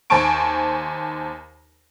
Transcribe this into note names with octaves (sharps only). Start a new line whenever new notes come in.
D#2 C5 G#5 A5 C#6 D7